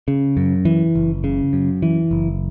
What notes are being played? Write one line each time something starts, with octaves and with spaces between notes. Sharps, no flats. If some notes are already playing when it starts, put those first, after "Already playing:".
C#3
F#2
E3
F#1
C#3
F#2
E3
F#1